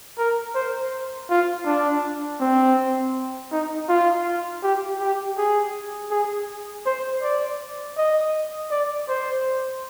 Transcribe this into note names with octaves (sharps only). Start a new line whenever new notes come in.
A#4
C5
F4
D4
C4
D#4
F4
G4
G4
G#4
G#4
C5
D5
D#5
D5
C5